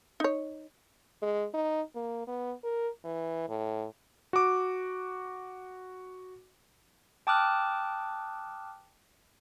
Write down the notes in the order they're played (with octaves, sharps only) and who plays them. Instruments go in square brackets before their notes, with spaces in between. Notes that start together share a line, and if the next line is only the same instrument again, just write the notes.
[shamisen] D#4 C#5
[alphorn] G#3
D#4
A#3
B3
A#4
E3
A2
[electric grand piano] F#4 D6
[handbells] G5 A5 D6 D#6 F6 F#6